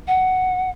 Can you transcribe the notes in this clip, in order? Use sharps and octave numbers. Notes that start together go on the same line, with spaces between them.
F#5